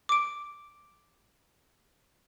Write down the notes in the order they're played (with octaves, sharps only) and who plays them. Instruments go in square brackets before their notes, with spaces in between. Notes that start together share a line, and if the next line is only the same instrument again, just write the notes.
[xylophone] D6 D7